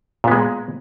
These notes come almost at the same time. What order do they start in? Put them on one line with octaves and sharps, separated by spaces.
A#2 B3 G#3